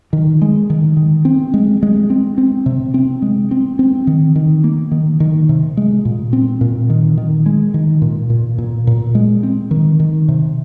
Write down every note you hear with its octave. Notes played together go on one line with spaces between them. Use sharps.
D#3
G#3
D#3
D#3
C4
G#3
G#3
C4
C4
C3
C4
G#3
C4
C4
D#3
D#3
A#3
D#3
D#3
C3
G#3
A#2
C4
A#2
D#3
D#3
G#3
D#3
A#2
A#2
A#2
A#2
G#3
C4
D#3
D#3
C3